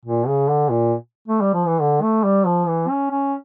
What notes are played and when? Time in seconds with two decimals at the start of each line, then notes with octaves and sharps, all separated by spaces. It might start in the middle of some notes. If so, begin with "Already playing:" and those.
0.06 A#2
0.28 C#3
0.49 D3
0.71 A#2
1.28 A3
1.41 G3
1.54 F3
1.67 E3
1.81 D3
2.02 A3
2.24 G3
2.46 F3
2.68 E3
2.90 C#4
3.11 C#4